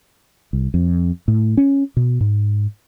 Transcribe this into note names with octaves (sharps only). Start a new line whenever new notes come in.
C2
F2
A2
C#4
B2
G#2